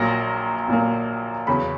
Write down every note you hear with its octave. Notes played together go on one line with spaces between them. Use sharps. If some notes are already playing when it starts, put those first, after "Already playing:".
Already playing: A#1 A#2 F#3 A#3 A#6
A#1 A#2 F#3 A#3
E2 C#3 F#3 B5